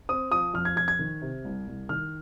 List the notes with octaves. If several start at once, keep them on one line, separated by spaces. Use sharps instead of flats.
C4 D#6
F3 D#6
F2 F6
G#6
F2 G#6
G#6
D#3
C3
C2
C2
D#3 F6